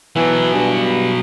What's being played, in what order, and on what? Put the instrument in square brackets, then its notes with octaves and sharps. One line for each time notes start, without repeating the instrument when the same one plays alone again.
[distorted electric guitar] B2 F#3 [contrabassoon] E3
[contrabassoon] G2